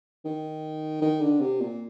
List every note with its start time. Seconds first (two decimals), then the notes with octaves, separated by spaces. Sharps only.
0.25 D#3
1.02 D#3
1.21 D3
1.40 C3
1.61 A#2